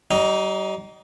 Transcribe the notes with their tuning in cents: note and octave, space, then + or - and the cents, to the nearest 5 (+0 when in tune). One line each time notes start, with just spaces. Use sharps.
G3 -40 D#4 +5